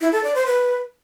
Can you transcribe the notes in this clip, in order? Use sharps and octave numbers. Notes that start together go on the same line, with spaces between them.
E4
A4
D5
C5
B4